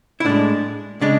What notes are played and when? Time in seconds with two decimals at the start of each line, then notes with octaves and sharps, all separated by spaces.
0.20 E4
0.25 A2 G#3 D4
1.01 C#3 G#3 D4